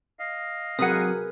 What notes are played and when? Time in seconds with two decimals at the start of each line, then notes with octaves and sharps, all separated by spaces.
0.19 D#5 F5
0.79 C3 F#3 G#4 A#4 B4 F#5 D#6